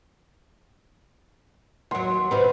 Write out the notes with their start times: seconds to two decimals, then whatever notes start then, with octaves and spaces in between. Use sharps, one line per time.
1.91 D#2 F#3 F#5 C6
2.31 C3 D#3 C4 B4